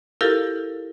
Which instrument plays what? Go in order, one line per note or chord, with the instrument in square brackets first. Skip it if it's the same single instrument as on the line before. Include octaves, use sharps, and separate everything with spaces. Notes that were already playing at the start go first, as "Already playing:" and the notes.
[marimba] E4 F4 G4 A4 A#4 F5